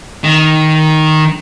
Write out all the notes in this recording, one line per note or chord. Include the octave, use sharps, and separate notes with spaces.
D#3